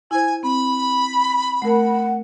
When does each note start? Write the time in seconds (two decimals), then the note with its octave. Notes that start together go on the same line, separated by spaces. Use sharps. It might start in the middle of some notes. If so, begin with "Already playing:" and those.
0.11 E4 C5 G#5
0.43 C4 B5
1.62 A3 A#4 F#5